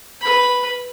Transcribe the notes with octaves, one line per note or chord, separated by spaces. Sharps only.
B4 B5